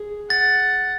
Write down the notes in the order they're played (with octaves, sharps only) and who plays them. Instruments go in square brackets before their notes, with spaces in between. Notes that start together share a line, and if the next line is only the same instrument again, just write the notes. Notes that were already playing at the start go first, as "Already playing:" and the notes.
Already playing: [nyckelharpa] G#4
[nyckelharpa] F#5 [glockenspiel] A6